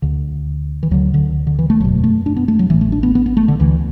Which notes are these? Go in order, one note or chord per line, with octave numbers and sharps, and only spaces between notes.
D2 D3
E3
D2 D3 F#3
D3
D3
E3
A3
F#1 E2 B2 F#3
A3
D4
B3
A3
F#3
A1 A2 E3
A3
D4
B3
B3
B3
A3
D3
D2 D3 E3